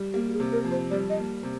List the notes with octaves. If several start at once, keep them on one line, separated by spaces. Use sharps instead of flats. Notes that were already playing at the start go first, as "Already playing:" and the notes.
Already playing: G3
A#3 G4
G4
G#4
C3
A#4
F2
C5
G3 D5
D#5
A#3
C3